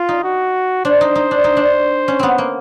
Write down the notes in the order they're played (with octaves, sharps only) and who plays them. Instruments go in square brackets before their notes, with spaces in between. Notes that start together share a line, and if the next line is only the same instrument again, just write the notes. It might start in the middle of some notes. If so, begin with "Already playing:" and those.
Already playing: [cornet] F4
[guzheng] D#4
[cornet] F#4
[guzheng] D4 [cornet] C5
[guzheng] D#4
D#4
D4
D#4
D4
C#4
B3 C4
A#3